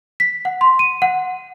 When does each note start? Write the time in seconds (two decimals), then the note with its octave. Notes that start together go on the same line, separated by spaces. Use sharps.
0.20 B6
0.45 F#5
0.61 C6
0.79 D#7
1.02 F#5